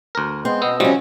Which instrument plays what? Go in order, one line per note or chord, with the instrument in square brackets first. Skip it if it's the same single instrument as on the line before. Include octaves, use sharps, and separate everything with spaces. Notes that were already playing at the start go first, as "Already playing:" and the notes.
[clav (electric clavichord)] D2 A#4
[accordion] G#3 B3 C6 [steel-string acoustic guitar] C4
[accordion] B2 D#5 E6 [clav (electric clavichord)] B3
[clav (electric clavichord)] C3 F3 G3 [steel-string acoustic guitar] C#4 F#4